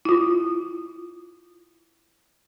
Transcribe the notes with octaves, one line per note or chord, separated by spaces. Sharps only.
E4 F4